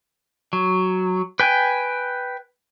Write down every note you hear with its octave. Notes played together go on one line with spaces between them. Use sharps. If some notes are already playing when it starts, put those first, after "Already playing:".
F#3
B4 G5 G#5